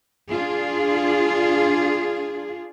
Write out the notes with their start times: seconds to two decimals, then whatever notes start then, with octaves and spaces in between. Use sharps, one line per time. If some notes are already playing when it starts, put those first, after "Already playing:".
0.30 D4 F4 G#4